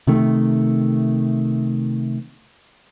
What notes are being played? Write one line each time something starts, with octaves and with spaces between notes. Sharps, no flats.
C3 D#3 A3